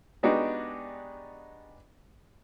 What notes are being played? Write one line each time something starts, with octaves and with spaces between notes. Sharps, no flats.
G#3 B3 D4 D#4 F#4 G4